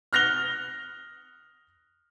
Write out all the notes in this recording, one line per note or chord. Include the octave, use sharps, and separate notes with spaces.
F6 F#6 A#6 F7 G7